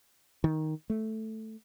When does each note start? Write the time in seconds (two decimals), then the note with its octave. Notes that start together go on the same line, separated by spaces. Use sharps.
0.44 D#3
0.90 A3